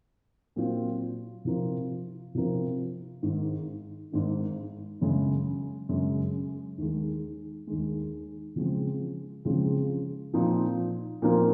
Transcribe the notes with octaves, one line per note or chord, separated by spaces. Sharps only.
A#2 F#3 C4 F4
C3 F3 C4 F4 A#4
C3 F3 C4 F4 A#4
G#1 G#2 D#3
G#1 G#2 D#3
F#2 C#3 G#3
F#2 C#3 G#3
D#2 D#3 G#3
D#2 D#3 G#3
C#3 F3 G#3 C4
C#3 F3 G#3 C4
A#2 F3 C4 D#4 A#4
A#2 F3 C4 D#4 A#4